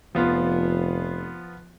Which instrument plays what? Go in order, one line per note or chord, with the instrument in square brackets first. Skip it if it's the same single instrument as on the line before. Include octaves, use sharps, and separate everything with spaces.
[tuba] F1 [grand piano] F3 B3 F4